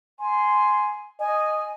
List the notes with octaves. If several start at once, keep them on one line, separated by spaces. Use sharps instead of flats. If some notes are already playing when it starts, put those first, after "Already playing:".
G#5 C6
D#5 G#5